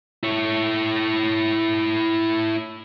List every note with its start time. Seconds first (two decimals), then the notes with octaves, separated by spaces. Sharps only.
0.23 E4 C#5